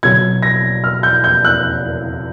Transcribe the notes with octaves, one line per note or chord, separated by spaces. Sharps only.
B2 F#3 G#6
A#6
F6
G6
G6
F#6